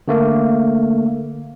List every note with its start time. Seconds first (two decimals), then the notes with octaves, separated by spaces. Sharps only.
0.08 D3 A3 A#3